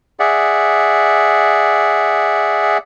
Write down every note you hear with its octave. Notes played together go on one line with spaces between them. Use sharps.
G#4 D5 E5 F#5